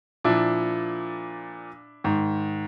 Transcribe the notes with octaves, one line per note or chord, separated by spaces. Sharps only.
A#2 F3 D4 E4
G#2 D#3